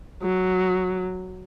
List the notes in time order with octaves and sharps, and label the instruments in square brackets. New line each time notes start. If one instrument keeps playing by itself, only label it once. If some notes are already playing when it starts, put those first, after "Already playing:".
[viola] F#3